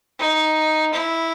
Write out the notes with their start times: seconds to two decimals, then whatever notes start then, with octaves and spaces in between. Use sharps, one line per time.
0.19 D#4
0.93 E4